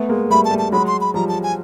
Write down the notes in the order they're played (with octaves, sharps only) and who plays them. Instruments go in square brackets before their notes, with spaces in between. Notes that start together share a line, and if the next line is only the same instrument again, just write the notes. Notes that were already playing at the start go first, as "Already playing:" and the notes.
Already playing: [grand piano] A3 B3
G#3 A#3
[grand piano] G3 A3 [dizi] B5
[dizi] A5
[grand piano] G3 A3
[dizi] A5
[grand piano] F#3 G#3 [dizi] B5
[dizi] C6
B5
[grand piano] F3 G3 [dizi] A#5
[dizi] A5
G#5